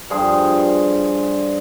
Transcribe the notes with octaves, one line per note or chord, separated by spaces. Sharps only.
G2 F3 G#4 C5